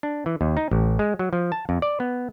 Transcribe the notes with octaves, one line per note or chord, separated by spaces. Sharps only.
D4
E3
D#2
D#4
A1
G#3
F#3
F3
A5
F2
D5
B3